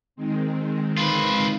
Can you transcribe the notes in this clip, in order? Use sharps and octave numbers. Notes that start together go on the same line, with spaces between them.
D#3 G#3 C4
F4 B4